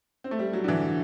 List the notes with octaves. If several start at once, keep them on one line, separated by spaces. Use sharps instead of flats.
C4
A3
G3
F#3
D3
E3